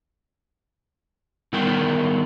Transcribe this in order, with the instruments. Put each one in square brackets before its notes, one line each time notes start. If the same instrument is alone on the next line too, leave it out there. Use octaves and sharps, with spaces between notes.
[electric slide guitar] D#3 G3 B3 A#4 G5